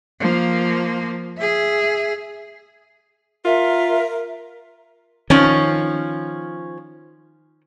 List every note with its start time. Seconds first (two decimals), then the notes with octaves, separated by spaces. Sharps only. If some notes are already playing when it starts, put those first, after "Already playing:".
0.20 F3 A#3
1.37 G#4 E5
3.45 F4 A#4 E5
5.30 D#3 F3 C#4